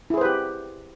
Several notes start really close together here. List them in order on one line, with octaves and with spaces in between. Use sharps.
E4 G#4 C5 B4 G4